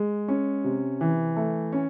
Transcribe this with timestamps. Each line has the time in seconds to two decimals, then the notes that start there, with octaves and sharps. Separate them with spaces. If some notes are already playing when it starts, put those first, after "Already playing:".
Already playing: G#3
0.28 C#4
0.64 C3
1.01 E3
1.36 A3
1.72 C#4